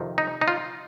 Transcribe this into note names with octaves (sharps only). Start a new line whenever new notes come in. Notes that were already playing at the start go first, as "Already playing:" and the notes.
Already playing: F2 C3 D#3
D#4
D#4
F4